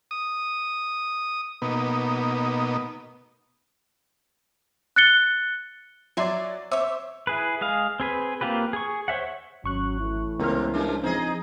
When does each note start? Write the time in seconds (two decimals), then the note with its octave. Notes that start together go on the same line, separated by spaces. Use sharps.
0.11 D#6
1.62 B2 A#3 B3 D#4
4.96 F#6 A6 C#7 G7
6.17 F#3 C#5 D5 E5 G#5 C6
6.71 C5 C#5 E5 D6 E6
7.27 E4 G#4 B4
7.61 G#3 G#4 F5
8.00 C4 G#4 B4
8.41 A#3 C4 F4 G4 B4
8.73 G#4 C#6
9.08 C5 C#5 E5 F#5
9.64 G#1 F#3 C#4 C#6 F#6
9.99 A2 E3 E4
10.40 C#2 C3 B3 C4 A#4 F6
10.74 F3 G3 D4
11.03 F3 C4 D#4 G#4 D#5